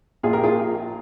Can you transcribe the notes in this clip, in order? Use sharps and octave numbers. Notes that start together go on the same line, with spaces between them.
A#1 A#2 F4 G#4
G4 A#4
F4 G#4